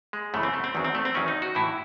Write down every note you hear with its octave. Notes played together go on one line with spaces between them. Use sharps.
G#3
F#2 C#3 E3 A3
C4
A3
C4
E2 D#3 F#3
C4
A3
C4
E2 D#3 F#3 C#4
D#4
F#4
A2 E3 E4